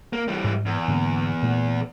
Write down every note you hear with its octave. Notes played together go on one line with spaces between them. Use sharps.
A#3
E3 G3
G#2
E2
G#2 D3 A#3
A#2 A3 A#3